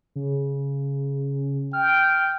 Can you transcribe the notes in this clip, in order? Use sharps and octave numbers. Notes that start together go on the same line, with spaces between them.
C#3
G5 F6